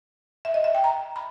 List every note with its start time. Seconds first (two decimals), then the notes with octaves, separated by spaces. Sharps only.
0.45 E5
0.54 D#5
0.64 E5
0.75 G5
0.84 A#5
1.16 B5